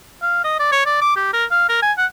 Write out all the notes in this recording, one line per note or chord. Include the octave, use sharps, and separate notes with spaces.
F5
D#5
D5
C#5
D5
D6
G4
A#4
F5
A#4
G#5
F#5